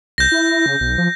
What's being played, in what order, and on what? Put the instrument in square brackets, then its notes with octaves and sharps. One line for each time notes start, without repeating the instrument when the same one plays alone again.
[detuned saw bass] C2 [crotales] G6 A#6
[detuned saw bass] E4
C#3
B1
F3